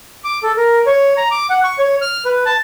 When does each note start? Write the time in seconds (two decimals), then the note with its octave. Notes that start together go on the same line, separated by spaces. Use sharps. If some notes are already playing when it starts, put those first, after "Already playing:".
0.24 D6
0.43 A4
0.57 A#4
0.86 C#5
1.17 A#5
1.31 D6
1.50 F#5
1.64 C#6
1.78 C#5
2.02 F6
2.25 B4
2.46 A5